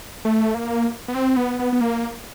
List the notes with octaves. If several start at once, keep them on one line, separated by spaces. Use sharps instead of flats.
A3
A#3
B3
C4
B3
B3
B3
A#3